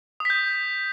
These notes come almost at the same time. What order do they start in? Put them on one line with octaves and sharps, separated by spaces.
D#6 B6 G6